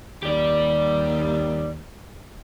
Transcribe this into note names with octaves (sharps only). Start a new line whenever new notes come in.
D#2 G4 D5